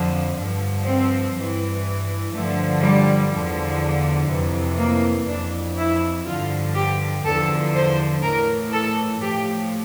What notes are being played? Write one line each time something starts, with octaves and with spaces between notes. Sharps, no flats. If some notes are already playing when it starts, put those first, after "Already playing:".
Already playing: F2 D3 F3
G2 D3 F3
C4
G2 E3
G2 D3 F3 A3
G3
E2 D3 F3
F2 C3 E3
A#3
F2 E3 D4
E4
G2 D3 F3 F4
G4
E2 D3 F3 A4
C5
A2 E3 A#4
A4
A2 F3 G4